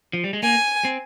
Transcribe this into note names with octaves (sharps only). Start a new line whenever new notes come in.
F3
G3
G#3
A#3 G#5
C4